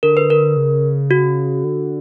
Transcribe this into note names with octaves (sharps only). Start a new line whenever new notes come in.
D3 A#4
B4
A#4
C#3
F#4
D3